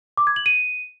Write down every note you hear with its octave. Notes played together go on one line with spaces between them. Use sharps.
D6
G#6
F#7
D#7